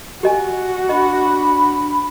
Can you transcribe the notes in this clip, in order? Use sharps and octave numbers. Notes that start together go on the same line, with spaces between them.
F#4 G4 D#5 G#5
D4 D#5 B5